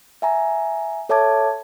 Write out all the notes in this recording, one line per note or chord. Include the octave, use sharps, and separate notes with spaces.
E5 G#5 A#5
A4 C#5 E5 A5 D6 G#6